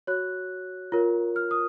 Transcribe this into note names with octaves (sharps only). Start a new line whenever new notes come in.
F#4 C#5 F#6
F4 A#4 C#5
F6
D#6